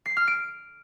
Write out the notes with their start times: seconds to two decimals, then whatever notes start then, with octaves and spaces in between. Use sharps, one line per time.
0.06 C7
0.17 F6
0.28 D7